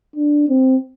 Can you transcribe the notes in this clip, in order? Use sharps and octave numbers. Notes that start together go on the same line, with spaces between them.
D4
C4